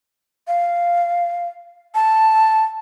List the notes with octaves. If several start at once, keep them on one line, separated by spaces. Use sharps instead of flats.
F5
A5